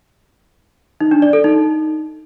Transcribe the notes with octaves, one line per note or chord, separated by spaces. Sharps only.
D#4
D4
D5
A4
D#4